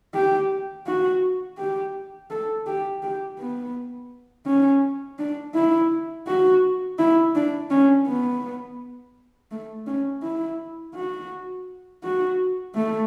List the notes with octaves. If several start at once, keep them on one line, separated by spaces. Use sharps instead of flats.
G4
F#4
G4
A4
G4
G4
B3
C#4
D4
E4
F#4
E4
D4
C#4
B3
A3
C#4
E4
F#4
F#4
A3